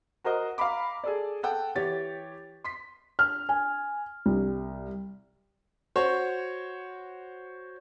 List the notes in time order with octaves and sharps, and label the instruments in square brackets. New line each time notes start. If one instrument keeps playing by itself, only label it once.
[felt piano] F#4 A#4 C5 D#5 F#5
F5 A#5 B5 D6
G#4 A4 D5
A4 F#5 G5
E3 G4 C#5 A6
C6 B6
F6
G#5
C2
[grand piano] F#4 C5 C#5